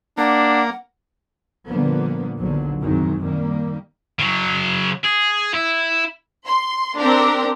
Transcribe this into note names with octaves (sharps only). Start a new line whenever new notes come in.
A#3 D4 F#5
A#2 D3 F3 G3 A#3 B3
A#1 D#2 B2 D3 F3 F#3
F#2 C3 D#3 F#3 G#3
D#3 G3 A#3
C#3 F#3
G#4
E4
C6
C4 D4 G4 A#4